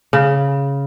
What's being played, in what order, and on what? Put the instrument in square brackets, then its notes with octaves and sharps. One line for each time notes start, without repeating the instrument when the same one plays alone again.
[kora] C#3